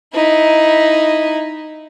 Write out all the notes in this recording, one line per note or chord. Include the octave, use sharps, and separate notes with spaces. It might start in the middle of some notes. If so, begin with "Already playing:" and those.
D#4 E4